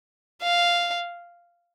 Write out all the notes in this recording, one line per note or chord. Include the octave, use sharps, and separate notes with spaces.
F5